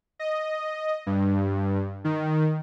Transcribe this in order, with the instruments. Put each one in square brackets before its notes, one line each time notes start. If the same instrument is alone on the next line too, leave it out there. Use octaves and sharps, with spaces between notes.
[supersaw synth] D#5
G2
D#3